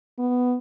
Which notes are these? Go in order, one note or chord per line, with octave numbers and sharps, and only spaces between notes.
B3